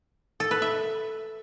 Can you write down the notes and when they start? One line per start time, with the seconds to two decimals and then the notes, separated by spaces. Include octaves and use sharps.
0.40 A4
0.51 B4
0.62 E5